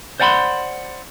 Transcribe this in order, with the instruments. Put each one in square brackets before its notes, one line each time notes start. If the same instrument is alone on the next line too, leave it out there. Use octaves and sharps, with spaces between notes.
[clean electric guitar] C5 D5 F#5 G#5 B5 C6